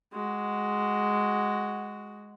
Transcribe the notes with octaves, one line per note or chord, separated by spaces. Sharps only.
G#3 F#4